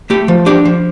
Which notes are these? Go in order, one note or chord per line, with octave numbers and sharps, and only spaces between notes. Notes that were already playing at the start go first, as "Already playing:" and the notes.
A3 G4
F3
D4 G4
F3